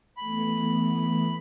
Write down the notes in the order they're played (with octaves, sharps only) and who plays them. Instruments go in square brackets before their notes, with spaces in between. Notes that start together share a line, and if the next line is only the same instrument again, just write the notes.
[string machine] E3 A3 B3 [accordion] B5